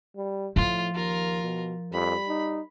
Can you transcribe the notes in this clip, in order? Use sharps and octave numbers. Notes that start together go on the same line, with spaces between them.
G3
A2 F3 F4
D#2 F4 A#4
B2
F2 G3 B5
D#4